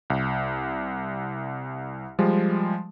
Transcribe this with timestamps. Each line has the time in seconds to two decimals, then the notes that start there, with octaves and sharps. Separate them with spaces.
0.10 C2
2.19 F3 G3 G#3